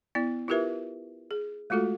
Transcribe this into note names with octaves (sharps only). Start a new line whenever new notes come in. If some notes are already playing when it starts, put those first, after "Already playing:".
B3 E4 D5
E4 F4 G4 A#4 B4 E5
G#4
G#3 A3 F4 F#4 A4